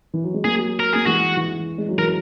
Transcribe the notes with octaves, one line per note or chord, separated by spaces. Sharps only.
E3
F#3
G#3
F#3 A#3 G#4
A#4
A#3 G#4
E3 G#3 F#4
E3
G#3
F#3
E3 A#4